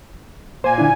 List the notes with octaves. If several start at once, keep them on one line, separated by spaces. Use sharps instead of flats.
A#2 A#3 C5 G#5
D3 D4 E4